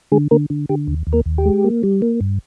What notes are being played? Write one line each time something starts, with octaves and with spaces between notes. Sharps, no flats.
D3 G#3 G#4
D3 A#3 A#4
D3
D3 G4
D#2
D#2
A#3 A#4
D#2
G4
G#3
A#3
G3
A#3
G2